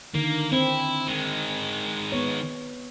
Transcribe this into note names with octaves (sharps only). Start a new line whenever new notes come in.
D3 D#3 A#3
C4 E4
D#3 G#3
B3 C#5